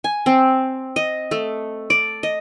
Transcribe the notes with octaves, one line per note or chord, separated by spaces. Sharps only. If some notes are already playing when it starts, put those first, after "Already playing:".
G#5
C4
D#5
A3
D5
D#5